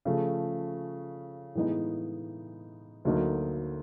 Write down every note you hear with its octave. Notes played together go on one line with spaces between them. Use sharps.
C#3 F3 A3
A2 E3 G#3 B3 D#4
D2 D3 F#3 A#3 D#4